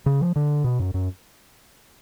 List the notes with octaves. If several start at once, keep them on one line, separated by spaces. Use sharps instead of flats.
C#3
F3
D3
B2
F#2
F#2